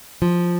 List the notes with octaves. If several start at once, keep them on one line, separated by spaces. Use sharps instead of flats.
F3